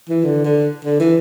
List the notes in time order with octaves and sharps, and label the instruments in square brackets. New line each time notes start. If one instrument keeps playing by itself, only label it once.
[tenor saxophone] E3
D3
D3
D3
E3